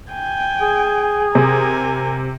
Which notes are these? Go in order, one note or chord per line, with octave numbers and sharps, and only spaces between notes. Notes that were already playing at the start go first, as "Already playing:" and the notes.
G5 G#5
G#4
C3 A#4 G#5